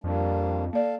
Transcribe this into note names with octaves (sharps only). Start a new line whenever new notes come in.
F2 G3 A#3 D4
A#3 A4 D5 F5 A5